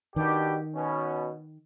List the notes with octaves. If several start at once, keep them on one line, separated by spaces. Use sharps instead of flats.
B2 D#3 D4 G4
B2 C#4